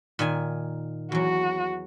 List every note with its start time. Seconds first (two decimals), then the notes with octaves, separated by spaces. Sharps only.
0.19 A#2 D#3 G#5
1.12 E2 F#3 F#4